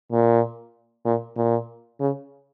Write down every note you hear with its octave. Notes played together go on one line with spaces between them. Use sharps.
A#2
A#2
A#2
C#3